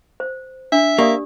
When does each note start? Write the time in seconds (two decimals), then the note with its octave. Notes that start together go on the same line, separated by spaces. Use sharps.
0.20 C5
0.72 D4 E5
0.98 A#3 G4 D5 D#6